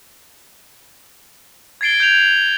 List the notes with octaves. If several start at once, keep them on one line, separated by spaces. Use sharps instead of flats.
G#6 A6 C7 D7 G7
G6 G#6 C7 F7 F#7